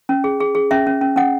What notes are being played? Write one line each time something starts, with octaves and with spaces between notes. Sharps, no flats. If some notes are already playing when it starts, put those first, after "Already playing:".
C#4
G#4
G#4
G#4
C#4 E5
C#4
C#4
C#4 F#5